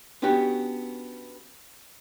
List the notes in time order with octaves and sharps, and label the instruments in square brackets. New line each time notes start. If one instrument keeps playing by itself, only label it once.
[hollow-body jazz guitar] B3 C#4 D4 F#4 G4